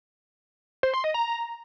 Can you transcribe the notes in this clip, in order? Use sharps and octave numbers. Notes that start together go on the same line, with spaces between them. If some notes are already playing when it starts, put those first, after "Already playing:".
C5
C6
D#5
A#5